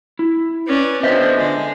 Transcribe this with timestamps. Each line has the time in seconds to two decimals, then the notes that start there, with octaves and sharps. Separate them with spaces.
0.19 E4
0.68 C#4 B4 D5
1.03 D3 F3 B3 C5 D#5 E5
1.36 D3 G#3